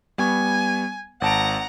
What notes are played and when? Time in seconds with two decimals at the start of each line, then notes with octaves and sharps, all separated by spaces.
0.18 G3 B3 G#5 C#6
1.22 G#1 F#5 A5 A#5 D7